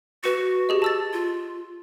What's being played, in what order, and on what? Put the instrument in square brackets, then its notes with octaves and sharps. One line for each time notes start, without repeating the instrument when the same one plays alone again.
[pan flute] F#4 [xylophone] B4 C#7
[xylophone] G4 G#4 D#5
A5 E6 A6
[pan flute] F4